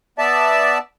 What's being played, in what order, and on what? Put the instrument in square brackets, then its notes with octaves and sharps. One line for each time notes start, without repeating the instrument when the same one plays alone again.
[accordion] B3 D5 E5 A5